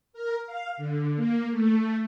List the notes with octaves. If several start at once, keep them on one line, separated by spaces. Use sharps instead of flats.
A#4
F5
D3
A#3
A3